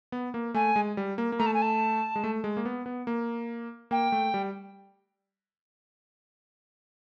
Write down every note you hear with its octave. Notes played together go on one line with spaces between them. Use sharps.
B3
A#3
A3 G#5
G#3
G3
A#3
A#3
A3 A#5
A5
G#5
A5
G#3
A3
G#3
A#3
B3
B3
A#3
A#3 G5
A3
G3